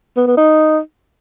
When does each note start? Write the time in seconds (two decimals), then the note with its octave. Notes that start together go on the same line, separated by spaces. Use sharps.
0.17 B3
0.27 B3
0.37 D#4